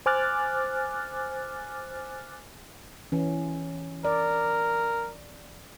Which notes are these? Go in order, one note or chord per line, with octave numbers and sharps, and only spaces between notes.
C5 G#5 D6 F6 F#6 A6
E3 C#4
A#4 D5